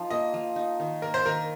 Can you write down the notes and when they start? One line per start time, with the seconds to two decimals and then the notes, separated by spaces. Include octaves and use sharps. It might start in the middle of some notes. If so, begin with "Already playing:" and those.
Already playing: F3 D#4
0.10 A#3 D#5
0.34 F3
0.56 D#4
0.80 D#3
1.02 A#3 A#4
1.14 C5
1.25 D#3 A#4